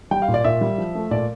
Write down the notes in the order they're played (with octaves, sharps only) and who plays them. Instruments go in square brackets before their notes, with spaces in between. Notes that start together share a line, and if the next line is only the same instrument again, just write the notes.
[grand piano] G3 G5
F5
A#2
D5
A#2 E5
G3
F3
A3
A#2 D5